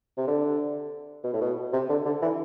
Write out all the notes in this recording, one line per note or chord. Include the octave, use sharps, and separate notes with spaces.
C3
D3
B2
A2
B2
C3
D3
D3
E3